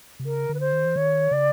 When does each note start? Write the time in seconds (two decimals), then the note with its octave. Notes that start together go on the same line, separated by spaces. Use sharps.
0.20 C3
0.25 C#3 A#4
0.49 D3
0.54 B4
0.60 C5
0.73 D#3
0.85 E3
0.96 D#3 C#5
1.31 C#3 D5